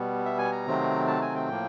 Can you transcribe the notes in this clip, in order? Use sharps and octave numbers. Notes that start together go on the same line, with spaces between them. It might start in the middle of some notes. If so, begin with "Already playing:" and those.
Already playing: B2 G3 B3
E5
G#5
A#5
C3 D#3 F#3 A3 C4
A5
G#5
G5
A2 F3 A#3